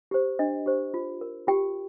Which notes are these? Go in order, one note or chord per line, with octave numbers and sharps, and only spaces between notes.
G4 C5
D4 D#5
G4 C5
F4
A#4
F4 G4 G5